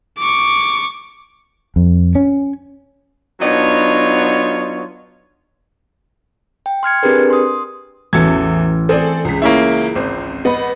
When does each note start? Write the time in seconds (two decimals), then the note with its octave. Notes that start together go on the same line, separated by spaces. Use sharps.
0.18 C#6 D6
1.76 F2
2.15 C#4
3.40 F#3 B3 D4 D#4 F4 C#5
6.66 G5
6.83 C6 F6 G#6 C#7
7.03 C4 D4 G4 G#4 A#4 B4
7.30 C6 D#6
8.13 A1 E2 F#4 A4 G#6 C#7
8.89 C4 G#4 A4 D5
9.25 C#2 C#3 B6
9.42 A#3 C#4 E4
9.95 G#1 C4
10.45 B3 D#5 B5